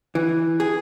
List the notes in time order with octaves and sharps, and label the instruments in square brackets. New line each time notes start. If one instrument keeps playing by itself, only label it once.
[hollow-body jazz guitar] E3
G#4